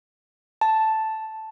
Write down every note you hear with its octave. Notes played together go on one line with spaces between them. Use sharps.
A5